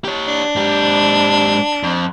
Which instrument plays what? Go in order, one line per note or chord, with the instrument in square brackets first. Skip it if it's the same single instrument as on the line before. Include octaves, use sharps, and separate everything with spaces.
[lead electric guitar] G4 C#5
[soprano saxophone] D4
[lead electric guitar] G#2 G4
F2